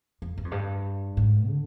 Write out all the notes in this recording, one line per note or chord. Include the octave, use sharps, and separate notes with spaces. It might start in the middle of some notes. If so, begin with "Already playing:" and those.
F2
G2
F2
G2
G#2
D3